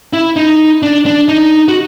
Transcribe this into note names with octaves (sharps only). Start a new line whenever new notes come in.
E4
D#4
D4
D4
D#4
F#4